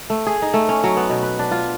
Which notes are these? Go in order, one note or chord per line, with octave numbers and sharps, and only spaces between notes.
A3
G#4
D#4
A3
C#4
F#3
B3
B2
B4
D4
F4